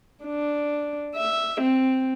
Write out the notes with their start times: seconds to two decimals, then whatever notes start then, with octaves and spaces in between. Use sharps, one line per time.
0.25 D4
1.16 E5
1.61 C4